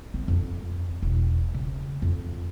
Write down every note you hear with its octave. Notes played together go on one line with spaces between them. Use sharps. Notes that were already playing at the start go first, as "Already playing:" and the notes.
C4
F2
E1
C#3
F2